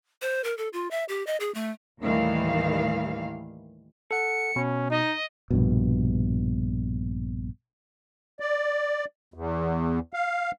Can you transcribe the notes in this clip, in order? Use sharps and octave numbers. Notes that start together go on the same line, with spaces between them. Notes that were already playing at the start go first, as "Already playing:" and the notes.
C5
A#4
A4
F4
E5
G4
D#5
G#4
A3
D#2 A2 D#3 E3 G3 F5
A4 F#5 C#7
B2 C#4
D#4 D#5
A#1 G2 B2
D5
E2
F5